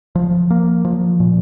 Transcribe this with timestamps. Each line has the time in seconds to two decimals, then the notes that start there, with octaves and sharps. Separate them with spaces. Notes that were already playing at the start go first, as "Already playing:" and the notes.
0.15 F3
0.50 A#3
0.85 F3
1.20 A#2